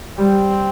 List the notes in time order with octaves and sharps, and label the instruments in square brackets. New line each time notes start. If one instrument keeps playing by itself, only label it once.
[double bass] G3 [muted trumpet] C4